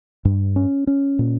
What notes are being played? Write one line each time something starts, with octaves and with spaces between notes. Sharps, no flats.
G2
C#4
C#4
A#2